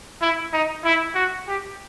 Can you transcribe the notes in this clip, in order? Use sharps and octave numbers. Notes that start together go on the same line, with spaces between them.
E4
D#4
E4
F#4
G4